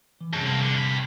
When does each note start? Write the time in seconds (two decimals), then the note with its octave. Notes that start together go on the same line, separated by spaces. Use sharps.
0.21 E3
0.33 C2 F#2 G#4 A5
0.46 A#3 C4
0.61 D3
0.74 G2 B5